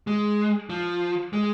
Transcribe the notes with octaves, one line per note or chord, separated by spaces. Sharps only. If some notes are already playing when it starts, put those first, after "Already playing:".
G#3
F3
G#3